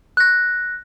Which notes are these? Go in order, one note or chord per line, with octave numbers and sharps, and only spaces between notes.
F#6 A#6